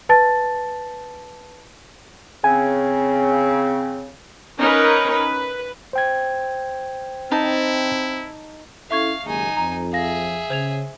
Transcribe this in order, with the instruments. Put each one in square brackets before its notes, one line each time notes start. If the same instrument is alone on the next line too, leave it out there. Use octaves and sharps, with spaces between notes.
[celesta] B4 A5 A6
[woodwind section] C#3 C4 [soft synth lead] G#5
[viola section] C#4 D#4 A#4 B4
B4
[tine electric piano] C5 G5 G#6
[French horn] C4 [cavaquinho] D#4 A5 [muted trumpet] E4
[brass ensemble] C#4 E4 A4 [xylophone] E5 C#6 G#6 [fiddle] F5
[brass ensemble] F#1 D#2 G#3 [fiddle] D#4 G#5
[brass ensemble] F2 [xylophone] A#5
[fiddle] G#4 E5 [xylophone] F5 A#6
[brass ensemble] C#3 [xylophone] C5 G#6 F7